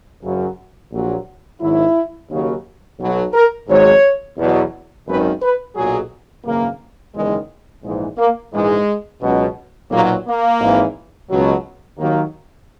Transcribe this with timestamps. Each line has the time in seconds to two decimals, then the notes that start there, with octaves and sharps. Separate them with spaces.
0.23 F#1 F#2 C#3 F#3
0.92 A#1 A#2 F#3
1.60 G#1 G#2 D#3 F#3 E4
2.30 D#2 C#3 F#3
2.99 B1 B2 F#3
3.34 A#4
3.69 G#1 G#2 F#3 C#5
4.38 E2 B2 F#3
5.07 G#1 F#2 D#3 B4
5.42 B4
5.76 B1 A#2 F#3 G#4
6.45 G#1 F#2 C#3 E3 A#3
7.15 F#1 E2 D#3 G#3
7.83 A#1 G#2 E3 G#3
8.18 A#3
8.53 A#1 G#2 E3 G#3
9.22 C#2 B2 F#3
9.91 B1 A#2 F#3 A#3
10.26 A#3
10.60 G#1 G#2 E3
11.29 C#2 B2 F#3
11.98 D#2 D#3 F#3 A#3